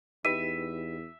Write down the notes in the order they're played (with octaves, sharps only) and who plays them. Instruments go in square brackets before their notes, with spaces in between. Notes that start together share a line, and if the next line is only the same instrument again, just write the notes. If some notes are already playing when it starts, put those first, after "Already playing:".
[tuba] E2 [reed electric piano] D#4 G4 B4 [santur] E5 [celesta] D#7